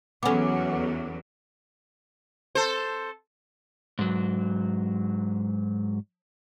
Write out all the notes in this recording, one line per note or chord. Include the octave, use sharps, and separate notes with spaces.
E2 F#3 B3 C#4 A4 F#5 D6
A4 C5
G#2 F#3